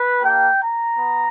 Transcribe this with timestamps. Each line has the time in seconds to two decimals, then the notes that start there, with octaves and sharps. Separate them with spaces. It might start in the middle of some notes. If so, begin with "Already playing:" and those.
Already playing: B4
0.22 A#3 D4 G4 G5
0.60 A#5
0.98 B3